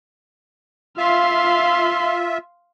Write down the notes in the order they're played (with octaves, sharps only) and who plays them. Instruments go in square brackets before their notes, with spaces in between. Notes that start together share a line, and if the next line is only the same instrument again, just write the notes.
[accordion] F4 E5 [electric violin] F5 C6